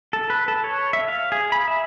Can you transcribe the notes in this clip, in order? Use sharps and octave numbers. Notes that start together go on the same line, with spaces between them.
A4
B4
A4
C#5
E5
F5
G#4
B5
E5